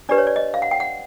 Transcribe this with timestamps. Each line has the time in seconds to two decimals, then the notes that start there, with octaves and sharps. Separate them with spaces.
0.09 D4 G4 B4 D5
0.18 C#5
0.27 D5
0.36 D#5
0.54 F5
0.62 F#5
0.71 G5
0.80 F#5